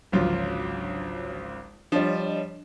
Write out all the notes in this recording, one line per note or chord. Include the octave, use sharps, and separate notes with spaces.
G#1 C#2 D3 F3 F#3 F4
F3 G3 D4 C#5 D#5